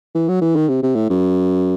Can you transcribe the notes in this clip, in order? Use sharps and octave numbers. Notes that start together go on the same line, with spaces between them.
E3
F#3
E3
D#3
C3
C3
A2
F#2